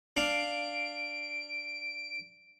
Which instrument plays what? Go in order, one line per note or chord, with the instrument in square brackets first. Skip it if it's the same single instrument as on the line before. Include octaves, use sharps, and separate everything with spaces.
[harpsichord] D4 F5 [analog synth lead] D7